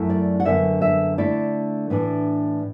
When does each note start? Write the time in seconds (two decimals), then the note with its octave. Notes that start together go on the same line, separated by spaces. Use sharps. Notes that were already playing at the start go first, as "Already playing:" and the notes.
Already playing: F#2 F#3 A3 E4
0.10 D5
0.40 F#5
0.45 F#2 D3 B3 E5
0.82 E5
1.18 D3 A3 E4 D5
1.90 A2 E3 D4